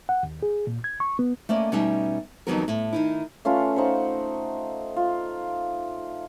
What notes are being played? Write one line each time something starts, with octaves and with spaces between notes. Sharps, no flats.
F#5
D#2
G#4
A#2
G#6
C#6
B3
A3 A#3 C#4 D5 D#5
B2 G3 C#4 D#4 E5
F2 D#3 F#3 G3 B3 A#4
A2
D#3 D#4 E4
A3 C#4 F4 B4
D#4 C5 F#5 C#6
F4